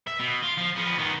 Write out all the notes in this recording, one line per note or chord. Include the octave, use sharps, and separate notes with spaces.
E5
B2
F4
F3
F3 B3
D#3 B3